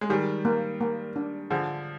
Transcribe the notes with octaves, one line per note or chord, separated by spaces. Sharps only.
G#3
D#3 G3 G#4
A#3
A#3
D4
D3 F3 G#4